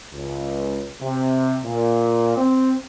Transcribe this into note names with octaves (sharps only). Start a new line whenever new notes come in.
C#2
C3
A#2
C4